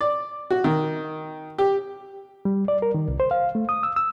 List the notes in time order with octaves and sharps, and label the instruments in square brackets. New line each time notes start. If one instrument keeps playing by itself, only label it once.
[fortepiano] D5
F#4
D#3
G4
[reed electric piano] G3
D5
A#4
D#3
C2
C5
F5
A3
D#6
E6
E6